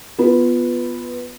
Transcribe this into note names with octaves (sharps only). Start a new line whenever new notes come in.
B3 F4 B4